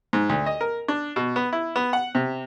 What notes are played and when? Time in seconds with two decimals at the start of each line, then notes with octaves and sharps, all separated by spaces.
0.13 G#2
0.29 D2
0.46 D#5
0.61 A#4
0.88 D4
1.16 B2
1.36 B3
1.53 E4
1.76 B3
1.93 F#5
2.15 C3